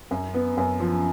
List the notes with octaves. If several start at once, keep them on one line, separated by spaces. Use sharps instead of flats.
F#2
B3
F#2
F3